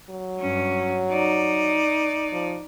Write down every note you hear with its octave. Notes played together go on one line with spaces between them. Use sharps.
F#3
G2 C#4
D#4 D5
F3